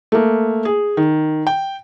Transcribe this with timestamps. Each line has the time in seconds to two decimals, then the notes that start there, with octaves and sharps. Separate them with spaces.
0.12 A3 A#3
0.65 G#4
0.97 D#3
1.47 G5